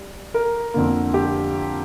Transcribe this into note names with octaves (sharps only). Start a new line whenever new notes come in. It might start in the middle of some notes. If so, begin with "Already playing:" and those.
Already playing: G3
A#4
F2 D3 A#3
G4